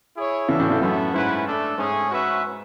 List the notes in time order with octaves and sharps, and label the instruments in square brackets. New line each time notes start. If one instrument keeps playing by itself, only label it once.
[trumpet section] E4 G#4 C#5
[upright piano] C#3 E3 [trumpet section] D4 F#4 A4 E5
[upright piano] A2 C#3
A2 C#3
[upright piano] F#2 A2 [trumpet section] B3 F#4 A4 E5
[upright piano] G#2 [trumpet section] C#4 E4 B4 F#5
[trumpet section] A3 D4 A4
[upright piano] G#2 [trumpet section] A3 C#4 G#4 C#5
[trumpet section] C#4 F#4 B4 E5